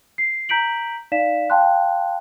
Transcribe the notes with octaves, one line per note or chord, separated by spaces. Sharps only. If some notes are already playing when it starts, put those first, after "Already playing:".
C7
A#5 G6 B6 D7 F#7
D#4 D5 F5 B6 E7
F5 G5 A5 C6 F#6